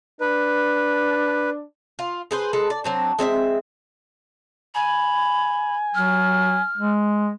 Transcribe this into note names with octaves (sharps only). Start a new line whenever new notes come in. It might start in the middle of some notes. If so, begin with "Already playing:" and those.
D4 B4
F4
G#4 B4 C5
G#3 A4 B4
D5
F#3 C4 D4
G#3 C4 C#5 E5
G#5 B5
F#3 F6
G#3